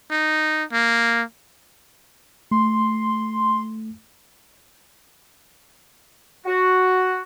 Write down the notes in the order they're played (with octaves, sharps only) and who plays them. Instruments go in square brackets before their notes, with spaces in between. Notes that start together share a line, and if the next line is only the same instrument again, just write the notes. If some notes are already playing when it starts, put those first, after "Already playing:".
[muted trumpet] D#4
A#3
[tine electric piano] A3 [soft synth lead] C6
[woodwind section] F#4